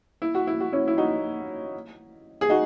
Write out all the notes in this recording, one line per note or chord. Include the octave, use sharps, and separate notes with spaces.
E4
F#4
E4
F#4
C#4 E4
E4
D#4 F#4
G#4
D#4 F#4